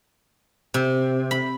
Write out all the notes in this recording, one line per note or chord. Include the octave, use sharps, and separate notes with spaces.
C3
B5